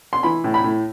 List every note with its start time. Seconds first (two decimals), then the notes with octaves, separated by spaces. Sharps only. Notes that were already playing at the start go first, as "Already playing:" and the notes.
0.13 C6
0.23 E3 B5
0.44 A2
0.54 B5
0.64 A2